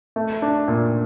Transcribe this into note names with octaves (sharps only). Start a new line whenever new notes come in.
A3
D4
A#2